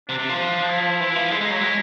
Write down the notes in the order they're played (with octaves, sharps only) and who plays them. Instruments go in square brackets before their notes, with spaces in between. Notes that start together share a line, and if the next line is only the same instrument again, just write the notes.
[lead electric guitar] C3 [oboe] D4
[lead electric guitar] C3
F3
[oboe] D#4
E4
[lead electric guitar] E3
F3
[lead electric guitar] G#3 [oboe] E4
[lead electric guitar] G#3 [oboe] D#4
[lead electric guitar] F#3 [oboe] E4
[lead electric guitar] G#3